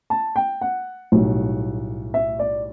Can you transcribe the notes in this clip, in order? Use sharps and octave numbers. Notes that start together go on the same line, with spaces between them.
A5
G5
F#5
B1 A2 G3
E5
D5